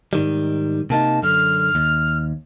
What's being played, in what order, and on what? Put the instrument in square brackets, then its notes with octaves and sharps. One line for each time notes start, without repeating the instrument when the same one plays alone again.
[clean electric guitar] G#2 D#3 G3
[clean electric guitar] C3 A#3 D#4 [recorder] A5
[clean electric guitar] F#2 D3 [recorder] F6
[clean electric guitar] D#2